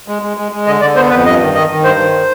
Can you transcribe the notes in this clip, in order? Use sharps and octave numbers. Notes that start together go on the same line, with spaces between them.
G#3
G#3
G#3
G#3
D3 D#5
D3 D5
B3 C5
F2 B4
G2 D#5
D#3
D#3 D#5
D#3
G2 C5
D#3